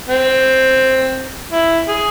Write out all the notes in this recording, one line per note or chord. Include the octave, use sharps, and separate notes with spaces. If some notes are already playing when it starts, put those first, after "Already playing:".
C4
E4
G#4